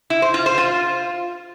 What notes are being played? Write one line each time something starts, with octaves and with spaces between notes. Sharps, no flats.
E4
C5
F4
C5
F4